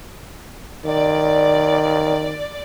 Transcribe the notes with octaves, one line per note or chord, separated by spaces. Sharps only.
D#3 D5